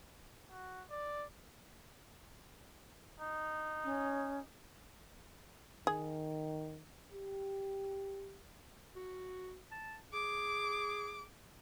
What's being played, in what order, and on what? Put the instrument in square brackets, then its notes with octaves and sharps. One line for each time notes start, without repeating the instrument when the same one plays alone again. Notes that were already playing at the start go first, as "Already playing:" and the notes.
[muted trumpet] F#4
D5
D#4
[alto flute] C#4
[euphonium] D#3 [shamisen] G#4
[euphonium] G4
[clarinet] F#4
A5
[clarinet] G#4 [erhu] D6